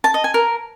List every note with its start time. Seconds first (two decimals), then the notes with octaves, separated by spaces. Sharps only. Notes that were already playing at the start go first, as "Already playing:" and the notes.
0.04 A5
0.14 D#5
0.24 G#5
0.34 A#4